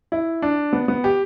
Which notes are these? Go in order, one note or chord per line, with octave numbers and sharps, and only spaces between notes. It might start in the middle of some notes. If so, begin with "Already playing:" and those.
E4
D4
B3
B3
G4